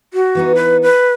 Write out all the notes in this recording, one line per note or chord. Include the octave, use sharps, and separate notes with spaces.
F#4
E3 B3 D#4
B4
B4